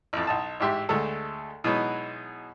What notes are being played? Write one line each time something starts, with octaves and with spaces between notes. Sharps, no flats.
A1 F2
B1 D#5 A5
A1 G#2 G4 E5 C6
D2 G#3 A3 A4
B2 E3 F#3 G#3 B3 D#4